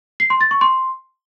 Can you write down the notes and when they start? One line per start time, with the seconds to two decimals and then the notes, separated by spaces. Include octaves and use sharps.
0.20 C7
0.30 C6
0.41 A6
0.51 C#6
0.61 C6